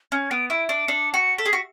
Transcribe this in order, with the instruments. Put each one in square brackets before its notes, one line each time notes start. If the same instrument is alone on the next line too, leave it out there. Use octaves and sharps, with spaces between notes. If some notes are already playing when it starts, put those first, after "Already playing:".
[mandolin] C#4 [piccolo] G#6
[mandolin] B3 [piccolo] D7
[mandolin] E4 [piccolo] D7
[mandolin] D4 [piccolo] D7
[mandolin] D4 [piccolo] C#7
[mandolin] F#4 [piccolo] C#7
[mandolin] A4 [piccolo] B6
[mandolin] G#4
F#4